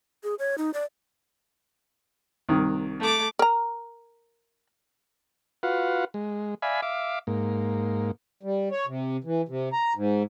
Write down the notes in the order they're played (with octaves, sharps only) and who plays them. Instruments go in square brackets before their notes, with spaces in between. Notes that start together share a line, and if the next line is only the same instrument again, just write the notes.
[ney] G#4
C#5
D#4
D5
[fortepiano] C2 D#3
[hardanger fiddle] A3 D6
[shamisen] A#4 A#5
[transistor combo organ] F4 F#4 B4 F5 F#5
G#3
D5 E5 F5 G#5 B5
E5 F5 D6
G#2 A#3
[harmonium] G3
C#5
C3
E3
C3
A#5
G#2